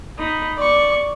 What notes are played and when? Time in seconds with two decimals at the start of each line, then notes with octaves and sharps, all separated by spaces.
0.18 D#4 B5
0.57 D5 C#6